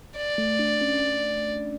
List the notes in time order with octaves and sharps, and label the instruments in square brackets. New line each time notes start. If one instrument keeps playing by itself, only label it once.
[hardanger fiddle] D5
[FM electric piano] A3
D4
C#4